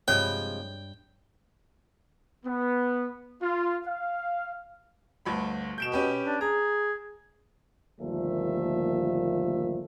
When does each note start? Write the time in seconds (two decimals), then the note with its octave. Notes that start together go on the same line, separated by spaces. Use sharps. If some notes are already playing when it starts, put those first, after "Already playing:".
0.08 G2 C3 F3 G#3 C#5 G5
2.46 B3
3.42 F4
3.87 F5
5.25 G1 D2 B5
5.78 B2 G6 D7 E7
5.92 C#4 G4 B4
6.27 D4
6.41 G#4 A#5
8.01 G1 D#2 A#2 F3 A3 E5